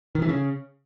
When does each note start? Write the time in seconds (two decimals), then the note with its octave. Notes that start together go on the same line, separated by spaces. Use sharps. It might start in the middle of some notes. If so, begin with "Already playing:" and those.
0.15 D#3
0.22 E3
0.29 C#3